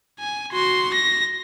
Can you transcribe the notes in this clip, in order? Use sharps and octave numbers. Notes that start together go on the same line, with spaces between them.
G#5
F#4 C6
A#6